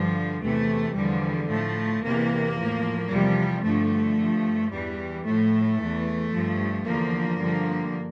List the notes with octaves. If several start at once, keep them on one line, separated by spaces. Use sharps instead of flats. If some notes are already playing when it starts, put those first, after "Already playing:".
Already playing: G2 D3 F3 G3
E2 C3 E3 A3
E2 D3 F3 G3
A2 F3 A3
E2 C3 E3 A#3
A2 F3
E2 C3 F3 G3
G2 D3 F3 A3
G2 F3
E2 E3 G3
A2 F3 A3
E2 E3
G2 F3
E2 D3 F3 A#3
G2 D3 F3